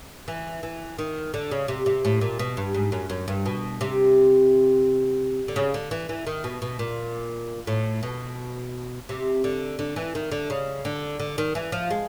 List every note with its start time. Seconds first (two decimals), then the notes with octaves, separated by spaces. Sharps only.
0.28 E3
0.63 E3
0.98 D#3
1.34 D3
1.51 C#3
1.68 C3
1.86 C3
2.05 A2
2.21 A#2
2.39 B2
2.57 G2
2.74 G#2
2.92 F#2
3.10 F#2
3.28 G2
3.46 B2
3.81 C3
5.48 D3
5.56 C#3
5.74 D3
5.91 E3
6.09 E3
6.27 D#3
6.44 B2
6.62 B2
6.79 A#2
7.67 A2
8.03 B2
9.09 C3
9.44 D3
9.79 D3
9.96 E3
10.15 D#3
10.31 D3
10.50 C#3
10.85 D3
11.20 D3
11.38 D#3
11.55 E3
11.72 F3
11.91 G#3